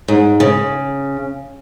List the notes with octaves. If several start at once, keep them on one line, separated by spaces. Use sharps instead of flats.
G#2
C#3